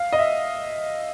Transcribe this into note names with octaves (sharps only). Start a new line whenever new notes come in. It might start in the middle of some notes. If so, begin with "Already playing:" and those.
Already playing: F5
D#5
E5